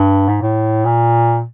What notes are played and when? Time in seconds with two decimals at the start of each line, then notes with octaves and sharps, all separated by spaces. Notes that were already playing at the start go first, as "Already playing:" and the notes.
Already playing: G2
0.28 G#2
0.42 A2
0.85 A#2